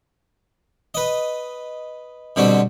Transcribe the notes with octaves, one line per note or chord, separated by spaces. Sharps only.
B4 D#5
B2 D3 G3 C4 F#4